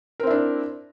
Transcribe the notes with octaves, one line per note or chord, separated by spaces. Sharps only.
C4 D4 E4 A#4